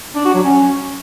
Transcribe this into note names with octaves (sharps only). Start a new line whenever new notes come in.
D4
F#4
F#3
C#4